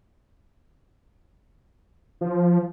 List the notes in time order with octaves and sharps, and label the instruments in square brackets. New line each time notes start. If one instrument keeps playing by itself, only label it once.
[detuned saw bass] F3